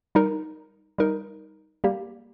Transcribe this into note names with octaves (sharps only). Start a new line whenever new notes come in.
G3 D#4 A#4
G3 D#4 A#4
G3 A#3 G4